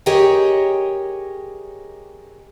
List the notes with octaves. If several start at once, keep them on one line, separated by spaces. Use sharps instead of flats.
G4 G#4 A#4 C#5 D#5 G5